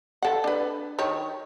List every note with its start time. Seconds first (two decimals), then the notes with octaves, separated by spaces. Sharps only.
0.22 A4 F#5
0.44 D4 B4
0.99 D#3 C#5